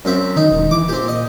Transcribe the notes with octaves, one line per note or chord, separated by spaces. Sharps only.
F#2 C4 E5
D#3 D#4
E1
E3 D6
A#2 C4 G4
D#5